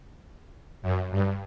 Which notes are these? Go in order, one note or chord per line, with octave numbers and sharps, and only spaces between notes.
F#2
G2